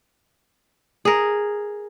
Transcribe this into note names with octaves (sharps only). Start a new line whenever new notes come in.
G#4 A#4